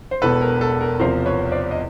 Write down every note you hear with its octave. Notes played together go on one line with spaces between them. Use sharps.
C5
E1 E2 B2 A4 B4
A#4
A4
A#4
E2 C3 F3 A#4 C5
B4 C#5
C5 D5
D#5